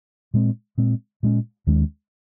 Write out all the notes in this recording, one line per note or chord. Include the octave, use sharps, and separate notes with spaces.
A#2 G#3 C4
A#2 G#3 C4
A#2 G#3 C#4
D#2 D#3 G#3 C#4